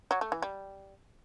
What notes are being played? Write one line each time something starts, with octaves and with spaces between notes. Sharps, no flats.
F#3
A3
E3
G3